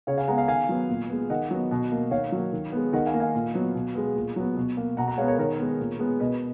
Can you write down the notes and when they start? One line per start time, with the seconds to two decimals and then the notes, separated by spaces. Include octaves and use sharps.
0.07 C#3 C#5 F5
0.18 F5 G#5
0.28 G#3 B3 F#5 A#5
0.38 F5 G#5
0.48 D#3 F5 G#5
0.69 F#3 B3
0.89 A#2
1.09 G#3 B3
1.30 D#3 D#5 F#5
1.51 F#3 B3
1.71 B2
1.92 A#3
2.11 D#3 C#5 F5
2.32 F#3 A#3
2.52 D#3
2.72 G#3 B3
2.93 D#3 D#5 F#5
3.06 F5 G#5
3.14 A#3
3.20 F5 G#5
3.35 A#2
3.54 F#3 B3
3.75 B2
3.95 G#3 B3
4.15 A#2
4.36 F#3 B3
4.57 B2
4.77 A#3
4.97 B2 F#5 A#5
5.08 F#5 A#5
5.18 G#3 B3 C#5 F5
5.28 A#4 C#5
5.38 D#3 A#4 C#5
5.59 G#3 B3
5.79 A#2
5.99 G#3 B3
6.20 B2 B4 D#5